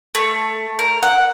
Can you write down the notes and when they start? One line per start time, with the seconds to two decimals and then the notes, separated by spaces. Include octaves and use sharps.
0.15 A3
0.79 A#4
1.03 F#5